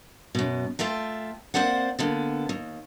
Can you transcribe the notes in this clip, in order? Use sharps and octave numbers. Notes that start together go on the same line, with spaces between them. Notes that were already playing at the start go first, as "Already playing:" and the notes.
F#2 B2
A3 F4 E5 G5
A#3 C4 C5 D5 F#5
D3 A#3 B3
D#2